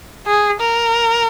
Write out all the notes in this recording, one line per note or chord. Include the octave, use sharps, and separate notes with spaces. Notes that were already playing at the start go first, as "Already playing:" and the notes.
G#4
A#4